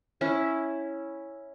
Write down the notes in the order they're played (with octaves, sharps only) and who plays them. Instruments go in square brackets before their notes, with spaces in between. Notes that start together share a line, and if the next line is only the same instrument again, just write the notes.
[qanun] C#4 E4